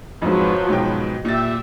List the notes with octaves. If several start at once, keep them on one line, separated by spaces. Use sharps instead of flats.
F2 G#2 F3 F#3 B4
G#2 B2 G5
A#2 G4 E5 A6